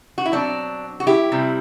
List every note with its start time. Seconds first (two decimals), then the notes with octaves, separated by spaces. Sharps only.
0.18 F#4
0.26 E4
0.32 B2 F#3 C4 D4
1.00 F#4
1.07 E4 G4
1.32 C3 G3 C4